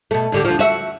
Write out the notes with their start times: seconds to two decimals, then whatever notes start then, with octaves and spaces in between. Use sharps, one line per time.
0.11 B2 A3
0.32 D2 D3 G4
0.45 D2 F3
0.59 F#4 E5